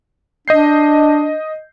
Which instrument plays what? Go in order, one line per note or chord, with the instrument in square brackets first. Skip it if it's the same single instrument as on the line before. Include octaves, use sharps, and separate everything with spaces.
[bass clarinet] D4 [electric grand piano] D#5 G6 C7